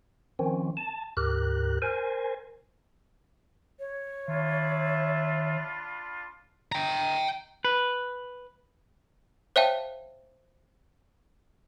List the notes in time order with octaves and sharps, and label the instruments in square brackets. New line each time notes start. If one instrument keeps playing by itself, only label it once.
[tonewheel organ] D#3 F3 C4 C#4
A5
D2 G#2 G4 A#4 F#6
A#4 C5 G#5
[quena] C#5
[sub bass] D#3 [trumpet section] D4 F4 B5 [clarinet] E5
[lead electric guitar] G5 A#5
[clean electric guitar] B4
[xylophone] C5 C#5 E5 F5 G5 A5